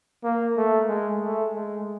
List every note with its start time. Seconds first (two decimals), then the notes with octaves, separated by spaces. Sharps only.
0.24 A#3
0.57 A3
0.88 G#3
1.21 A3
1.54 G#3